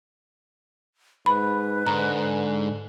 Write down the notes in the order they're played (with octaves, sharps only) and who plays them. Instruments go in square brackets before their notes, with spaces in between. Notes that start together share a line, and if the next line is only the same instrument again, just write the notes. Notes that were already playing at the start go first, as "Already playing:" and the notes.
[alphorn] G#2 [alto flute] B4 [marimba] B5
[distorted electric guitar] G#2 [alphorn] D3 [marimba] A#5